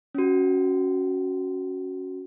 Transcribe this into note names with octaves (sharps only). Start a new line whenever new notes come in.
C#4 F#4